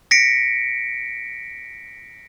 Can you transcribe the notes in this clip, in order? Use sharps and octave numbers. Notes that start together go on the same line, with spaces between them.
A#6 B6 C#7 D7